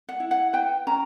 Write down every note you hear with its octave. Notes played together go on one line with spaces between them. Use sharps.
F#5
E4
F#5
B4 G5
C#4 A#5